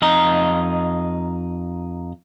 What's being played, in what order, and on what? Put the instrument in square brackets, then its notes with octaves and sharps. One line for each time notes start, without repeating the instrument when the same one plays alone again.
[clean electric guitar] F2 D#4 D#5 A#5